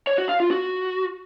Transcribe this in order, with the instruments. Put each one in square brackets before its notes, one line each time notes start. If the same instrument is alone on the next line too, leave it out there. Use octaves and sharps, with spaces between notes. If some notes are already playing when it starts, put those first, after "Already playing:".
[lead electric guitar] C#5
F#4
F5
F4
F#4